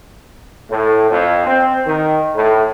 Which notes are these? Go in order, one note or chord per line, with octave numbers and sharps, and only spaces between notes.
A2
F2
C4
D#3
A2